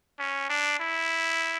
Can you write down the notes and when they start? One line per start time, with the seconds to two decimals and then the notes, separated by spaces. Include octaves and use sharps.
0.19 C#4
0.49 D4
0.79 E4